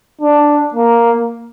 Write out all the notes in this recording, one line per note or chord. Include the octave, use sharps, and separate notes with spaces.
D4
A#3